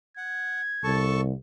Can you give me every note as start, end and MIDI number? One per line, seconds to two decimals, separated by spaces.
0.17 0.61 78
0.17 0.93 92
0.84 1.33 36
0.84 1.21 69
0.84 1.21 81
0.84 1.21 85